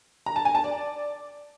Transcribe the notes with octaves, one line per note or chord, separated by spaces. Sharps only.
A#5
A5
G#5
A5
D5